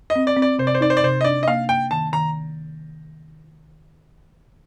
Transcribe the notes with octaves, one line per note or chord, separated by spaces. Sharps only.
D#5
C4
D5
C4
D5
C3 C5
D5
C5
D#4 D5
C5
D5
C3 C5
D#5
D4 D5
D#5
A#3 F5
A#3 G5
D#3 A5
D#3 A#5